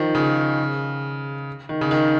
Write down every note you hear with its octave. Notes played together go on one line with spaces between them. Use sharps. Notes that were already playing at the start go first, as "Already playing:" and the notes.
Already playing: D#3 F3
C#3
D#3
C#3
D#3